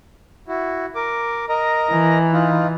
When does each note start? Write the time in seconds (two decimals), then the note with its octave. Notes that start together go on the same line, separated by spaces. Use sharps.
0.48 E4 F#4
0.95 A#4 D6
1.49 A#4 D#5 A#5
1.90 E3
2.33 D#4 F4